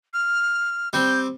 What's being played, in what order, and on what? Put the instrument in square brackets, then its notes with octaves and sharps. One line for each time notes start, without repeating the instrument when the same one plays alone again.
[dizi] F6
[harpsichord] G3 C4 [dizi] G6